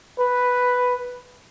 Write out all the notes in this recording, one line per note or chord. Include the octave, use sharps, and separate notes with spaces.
B4